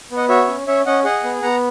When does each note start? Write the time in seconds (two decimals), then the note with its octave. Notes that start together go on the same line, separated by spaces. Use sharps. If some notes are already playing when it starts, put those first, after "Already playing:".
0.11 B3
0.17 D#5 F#5
0.29 F#4 C#5 E5
0.48 C#4
0.67 C#4 C#5 E5
0.86 C#4 D#5 F#5
1.04 G#4 D#5 F#5
1.24 B3
1.42 B3 F#5 A#5